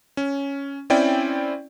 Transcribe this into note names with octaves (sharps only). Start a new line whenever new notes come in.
C#4
C4 C#4 E4 D5 G5